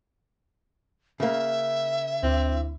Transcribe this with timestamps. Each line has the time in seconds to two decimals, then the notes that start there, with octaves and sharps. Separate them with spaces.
1.20 C#3 A#3 E5
2.23 D2 C4 E4